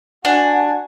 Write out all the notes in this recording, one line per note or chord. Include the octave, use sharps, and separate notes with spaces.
D4 F#4 F#5 G#5